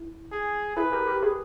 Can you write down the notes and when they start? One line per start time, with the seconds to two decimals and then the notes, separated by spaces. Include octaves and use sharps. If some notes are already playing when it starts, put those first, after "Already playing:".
Already playing: E4
0.31 G#4
0.76 E4 G#4 B4
0.92 G4 A#4
1.07 G4 A#4
1.22 G#4 B4